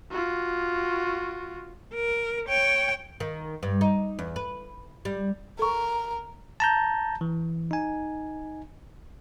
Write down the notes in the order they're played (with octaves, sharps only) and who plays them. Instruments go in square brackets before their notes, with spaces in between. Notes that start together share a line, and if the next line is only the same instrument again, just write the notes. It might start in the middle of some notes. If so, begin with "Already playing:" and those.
[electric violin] F4 F#4
[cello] A#4
C#5 G5
[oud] D#3
G2
D#4
E2
B4
G3
[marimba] A4 C#6 [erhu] A#4
[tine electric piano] A5 A#5 G6
E3
D#4 G#5